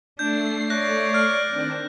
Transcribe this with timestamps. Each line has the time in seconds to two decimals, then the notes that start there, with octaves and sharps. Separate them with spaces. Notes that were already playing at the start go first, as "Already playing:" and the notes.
0.19 A3 D4 G6 C7
0.70 C#5 D5 F#6 A#6
1.14 F6
1.48 D#3 C4 D4